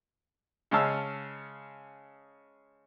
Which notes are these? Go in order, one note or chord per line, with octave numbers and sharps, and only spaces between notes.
C#3 G#3 C#4 F5 A5 E6